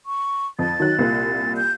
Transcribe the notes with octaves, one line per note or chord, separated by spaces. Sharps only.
C#6
F2 A6
D#3 F#3 F#6
C2 A#2 F4
G6